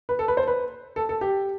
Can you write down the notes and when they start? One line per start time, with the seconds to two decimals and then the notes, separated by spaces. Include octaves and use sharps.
0.09 B4
0.19 A4
0.28 B4
0.37 C5
0.48 B4
0.96 A4
1.09 A4
1.21 G4